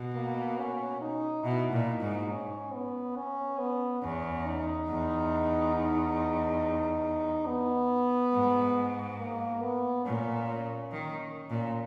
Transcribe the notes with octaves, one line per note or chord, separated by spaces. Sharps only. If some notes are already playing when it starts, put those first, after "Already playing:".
Already playing: B2
A#3
C#4
D#4
B2 E4
A#2
D#4
G#2
C#4
B3
C#4
B3
E2 C#4
D#4
E2
D#4
B3
G#2
A#3
B3
A#2 C#4
D#3
A#2